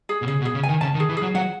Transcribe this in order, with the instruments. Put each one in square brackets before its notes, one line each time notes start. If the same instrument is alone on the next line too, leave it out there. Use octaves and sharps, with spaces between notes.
[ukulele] G#4
[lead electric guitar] B2
[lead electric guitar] C#3 [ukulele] G#4
[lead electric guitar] B2
[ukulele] G#4
[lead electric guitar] C#3
[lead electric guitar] D#3 [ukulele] G#5
[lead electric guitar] C#3 [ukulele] A5
[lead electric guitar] D#3
[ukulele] G#4
[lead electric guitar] E3
[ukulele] G#4
[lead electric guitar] F#3
[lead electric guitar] F#3 [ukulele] F#5